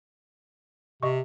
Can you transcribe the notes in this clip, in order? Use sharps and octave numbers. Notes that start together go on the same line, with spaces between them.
C3 D#5 C#6